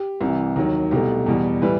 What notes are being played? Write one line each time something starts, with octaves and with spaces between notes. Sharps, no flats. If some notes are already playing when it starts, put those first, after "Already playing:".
Already playing: G4
C2 C3 E3
D#2 D#3 F#3
C2 B2 A3 G4
E2 B2 G3
A2 E3 G3 B4